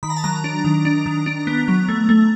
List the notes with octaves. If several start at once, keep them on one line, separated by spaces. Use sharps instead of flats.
D#3 B5
A#5
A5
F#3 A#5
D4
D#3
D4
D#3
D4
B3
F#3
A3
A3